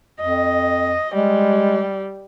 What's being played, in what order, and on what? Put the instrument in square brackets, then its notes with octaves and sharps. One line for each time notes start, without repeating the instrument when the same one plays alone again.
[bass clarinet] F2 [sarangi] D#5
[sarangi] G3 [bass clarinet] G#3